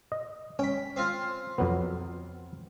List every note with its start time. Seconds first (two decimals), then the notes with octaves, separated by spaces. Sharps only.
0.12 D#5
0.59 C#4 G5 B5
0.96 C4 F4
1.58 F2 F#3 B3